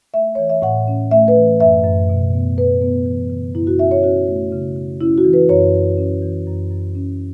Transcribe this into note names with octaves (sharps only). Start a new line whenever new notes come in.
A3 E5
E3 C#5
E5
A2 F#5
C#4
A3 E5
B4
E3
F#2 E5
F#2
B2
B3
B2 B4
B3
E3
C#3
F#2 E4
F#4
C#4 E5
C#5
C#4 F#4
A3
C#3
C#3
C#4 E4
F#4
E3
B4
F#2 C#5
F#2
C#4
E3
F#2
F#2
C#4